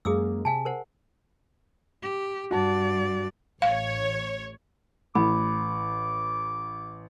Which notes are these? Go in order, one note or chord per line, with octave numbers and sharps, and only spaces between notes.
F#2 G#3 A#3 G#4 D#6 E6
C3 F5 G#5 A5
A#4 C5 F#5
G4
G2 F#4 D5 A5
A1 C#5 F5
A1 A3 B5 D6